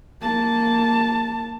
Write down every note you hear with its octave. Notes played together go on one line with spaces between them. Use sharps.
A#3 A5